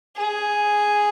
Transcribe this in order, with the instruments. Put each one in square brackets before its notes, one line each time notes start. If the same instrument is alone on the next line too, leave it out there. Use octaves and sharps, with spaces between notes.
[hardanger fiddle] G#4